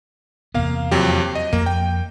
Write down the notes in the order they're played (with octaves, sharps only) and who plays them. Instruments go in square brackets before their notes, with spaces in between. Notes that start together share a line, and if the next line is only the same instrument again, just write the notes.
[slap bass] E2 C3 B3 [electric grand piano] A#3 F5
[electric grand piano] F2 F#3 G4
D#5
[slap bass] F2 [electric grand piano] A#3
[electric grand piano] G5